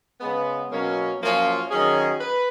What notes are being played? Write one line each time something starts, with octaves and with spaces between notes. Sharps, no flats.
C#3 G#3 B3
B2 F#3 A#3 C#4
F#2 F3 A#3 C#4 F4
D#3 F#3 C#4 G#4
B4